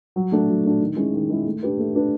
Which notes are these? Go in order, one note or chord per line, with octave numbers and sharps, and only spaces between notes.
F#3
A3 D4 F#4
F#3
A3 D4 F#4
D#3
G#3 C#4 E4
D#3
G#3 C#4 E4
A3
D4 G4 B4
A3
D4 G4 B4